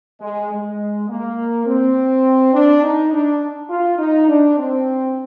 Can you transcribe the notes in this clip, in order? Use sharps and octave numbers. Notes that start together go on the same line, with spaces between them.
G#3
G#3
A#3
C4
D4
D#4
D4
F4
D#4
D4
C4